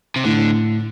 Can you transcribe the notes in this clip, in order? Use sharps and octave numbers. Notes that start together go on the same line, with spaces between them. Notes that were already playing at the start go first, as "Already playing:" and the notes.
C3
A2 D3